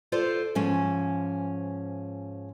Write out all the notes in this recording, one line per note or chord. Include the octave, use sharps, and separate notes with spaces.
F4 A4 C5 D5
G#2 F3 C#4